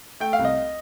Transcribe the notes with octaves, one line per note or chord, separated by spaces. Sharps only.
A3 G5
F5
C2
D#5